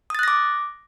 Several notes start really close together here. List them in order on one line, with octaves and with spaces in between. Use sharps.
D#6 A6 F#6 A#6 D6